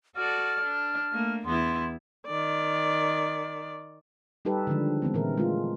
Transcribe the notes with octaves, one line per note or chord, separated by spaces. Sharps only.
F#4 A4 D5 F6
D4
A3 A#3
E2 B3 E4 C6
D#3 D5
G3 D#4 G4 A4 B4
D3 D#3 F3 G#3 D4
E3 G#3 B3 C4
A#2 E3 E4 A#4
G#3 A3 F4